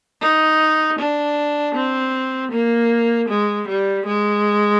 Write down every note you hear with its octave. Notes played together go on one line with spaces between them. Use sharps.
D#4
D4
C4
A#3
G#3
G3
G#3